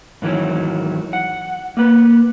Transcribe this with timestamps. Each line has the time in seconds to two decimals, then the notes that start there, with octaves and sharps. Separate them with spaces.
0.22 G#2 D#3 E3 F#3
1.13 F#5
1.77 A#3 B4